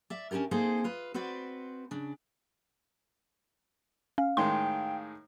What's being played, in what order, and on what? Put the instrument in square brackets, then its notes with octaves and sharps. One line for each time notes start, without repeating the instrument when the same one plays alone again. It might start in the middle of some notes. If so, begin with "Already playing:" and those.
[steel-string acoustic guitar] D5 E5
C#4 D4 F4 G4 A#4
A#3 C4 D#4 G#4 A4 C5
F4 B4
C4 F#4 B4 C5 D5
C#3 D4
[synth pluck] C#4 [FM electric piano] F5
[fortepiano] A2 D#3 G#3 [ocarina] G5 [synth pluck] C6